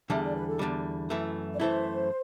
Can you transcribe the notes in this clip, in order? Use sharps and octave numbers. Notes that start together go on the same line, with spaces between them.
E2 D3 G3 E5
D5
B4
A4
E2 D3 G3
F#2 E3 A3 E4
D5
F#2 E3 A3 E4 C5